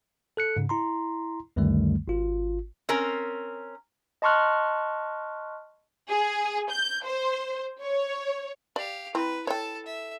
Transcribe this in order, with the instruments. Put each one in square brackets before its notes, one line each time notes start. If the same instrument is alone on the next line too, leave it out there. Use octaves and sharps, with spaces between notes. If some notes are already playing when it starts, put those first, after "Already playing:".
[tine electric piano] A4 F#6 C#7
G#2 C#3
E4 A#5 C6
C#2 F#2 D3 D#3 G3 A3
G#1 F4
[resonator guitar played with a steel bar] C4 C#4 A#4
[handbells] D#5 A5 C6 C#6 F6 F#6
[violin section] G#4
G6
C5
C#5
[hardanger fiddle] G4 F5 [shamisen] D5
[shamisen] C4 [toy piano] E4 B5 [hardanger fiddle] B4
[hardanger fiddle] A4 A5 [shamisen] C#5 G5
[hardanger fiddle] E5